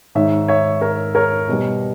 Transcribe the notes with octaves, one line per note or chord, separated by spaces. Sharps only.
G#2 D#3 G#3 C#5 E5
C#5 E5
A#4 C#5
A#4 C#5
B2 G3